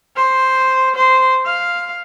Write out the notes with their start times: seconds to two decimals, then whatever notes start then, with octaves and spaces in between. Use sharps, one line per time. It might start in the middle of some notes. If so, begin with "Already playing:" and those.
0.17 C5
0.96 C5
1.45 F5